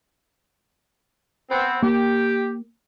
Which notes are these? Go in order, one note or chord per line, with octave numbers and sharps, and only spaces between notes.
B3 C4
A#3 G4